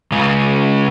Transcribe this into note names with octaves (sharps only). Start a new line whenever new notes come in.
C#3 G#3